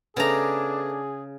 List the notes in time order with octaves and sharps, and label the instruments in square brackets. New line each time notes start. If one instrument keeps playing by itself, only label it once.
[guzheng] C#3 A#5 [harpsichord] A3 B3 [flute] D4 [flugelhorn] G#4